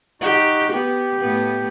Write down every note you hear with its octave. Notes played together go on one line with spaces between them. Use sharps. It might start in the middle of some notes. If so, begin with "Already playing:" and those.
D#4 F#4 G4
B3 G4
A2 B3